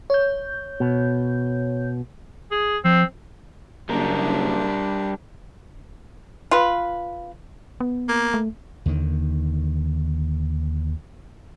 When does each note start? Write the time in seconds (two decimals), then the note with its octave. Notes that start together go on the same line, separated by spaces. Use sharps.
0.10 C#5 G6
0.80 B2
2.51 G#4
2.84 F3 C4
3.89 F#1 G3 D4 A#4
6.51 F4 B4
7.80 B3
8.09 A#3
8.34 A3
8.86 D#2 D3 D#3